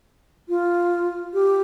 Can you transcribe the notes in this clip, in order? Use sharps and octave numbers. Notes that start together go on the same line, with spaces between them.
F4
G4